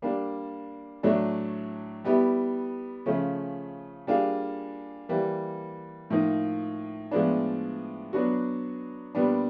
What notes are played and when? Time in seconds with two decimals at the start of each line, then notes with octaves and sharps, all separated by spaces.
0.02 G3 A#3 D4
1.03 A2 F#3 A3 D4
2.04 G3 B3 E4 G4
3.06 C#3 F3 A3 C#4
4.07 G3 A#3 D4 F4 G#4
5.09 E3 G3 A#3
6.10 A2 F3 A#3 D#4
7.11 A2 F3 G#3 B3 D4
8.13 F#3 B3 D4 F#4
9.15 A#2 G3 B3 D4